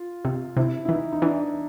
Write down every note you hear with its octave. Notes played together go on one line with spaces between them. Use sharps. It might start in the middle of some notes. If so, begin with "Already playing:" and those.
Already playing: F4
C3
C3 E4
E4
E3 D#4
D#4
E3 D4